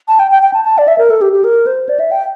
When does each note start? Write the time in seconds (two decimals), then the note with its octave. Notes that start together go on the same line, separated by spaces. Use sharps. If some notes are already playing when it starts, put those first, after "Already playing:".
0.08 A5
0.19 G5
0.31 G5
0.43 G5
0.54 A5
0.65 A5
0.78 D5
0.88 E5
0.98 A#4
1.10 A4
1.21 G4
1.33 G4
1.44 A#4
1.66 C5
1.89 D5
2.00 E5
2.11 G5